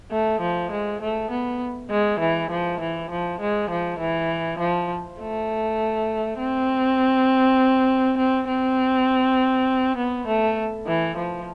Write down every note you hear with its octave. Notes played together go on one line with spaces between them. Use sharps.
A3
F3
G#3
A3
B3
G#3
E3
F3
E3
F3
G#3
F3
E3
F3
A3
C4
C4
C4
B3
A3
E3
F3